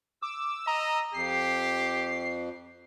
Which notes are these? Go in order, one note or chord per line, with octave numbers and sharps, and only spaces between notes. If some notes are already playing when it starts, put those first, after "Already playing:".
D6 E6
D#5 A#5
F2 G4 C7